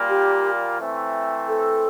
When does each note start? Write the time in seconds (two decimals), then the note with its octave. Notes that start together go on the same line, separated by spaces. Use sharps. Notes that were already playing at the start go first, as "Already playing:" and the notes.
Already playing: A#2 G3 A#3 F4
0.09 G4
0.78 E3 A3 C4
1.48 A4